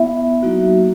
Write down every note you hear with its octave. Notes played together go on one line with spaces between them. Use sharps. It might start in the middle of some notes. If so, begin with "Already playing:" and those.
Already playing: B3 E4 E5
F#3 A#3 D#4 F#4